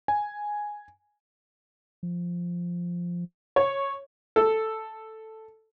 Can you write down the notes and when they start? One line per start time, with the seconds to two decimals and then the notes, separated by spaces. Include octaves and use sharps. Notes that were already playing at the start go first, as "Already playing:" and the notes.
0.08 G#5
2.03 F3
3.56 C#5
4.36 A4